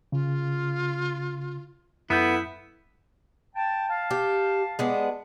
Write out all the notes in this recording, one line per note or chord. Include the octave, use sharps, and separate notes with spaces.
C#3 F4
F#2 B3 E4 A4 G6
G5 A5
F5 A5
G4
G#3 B3 D4